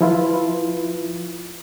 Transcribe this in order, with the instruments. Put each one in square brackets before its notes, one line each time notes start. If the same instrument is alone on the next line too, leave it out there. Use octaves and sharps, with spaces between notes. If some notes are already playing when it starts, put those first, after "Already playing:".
[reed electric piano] F3 E4 F4 B4